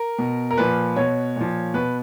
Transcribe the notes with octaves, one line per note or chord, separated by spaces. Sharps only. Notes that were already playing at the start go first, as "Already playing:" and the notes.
Already playing: A#4
B2
A#4
A#2 F3 B4
B2 C#5
A#2 F3
B2 B4